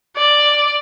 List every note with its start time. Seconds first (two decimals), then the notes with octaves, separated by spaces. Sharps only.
0.17 D5